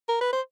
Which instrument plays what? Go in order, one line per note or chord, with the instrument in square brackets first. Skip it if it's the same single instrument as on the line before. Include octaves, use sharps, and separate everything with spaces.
[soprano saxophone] A#4
B4
C5